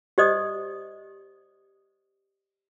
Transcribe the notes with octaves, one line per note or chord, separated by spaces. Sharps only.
G4 C5 D5 D#5 D#6